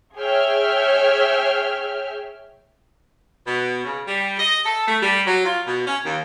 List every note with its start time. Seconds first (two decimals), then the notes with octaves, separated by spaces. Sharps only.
0.18 G#4 C#5 E5 G5 F6
3.46 B2
3.84 C#3
4.07 G3
4.38 D#5
4.64 A4
4.87 A3
5.01 G3
5.25 F#3
5.44 F4
5.65 B2
5.86 C#4
6.04 D#2